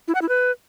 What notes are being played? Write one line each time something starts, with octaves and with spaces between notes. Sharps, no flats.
E4
F#5
E4
B4